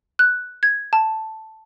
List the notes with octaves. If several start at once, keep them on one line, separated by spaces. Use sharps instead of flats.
F#6
G#6
A5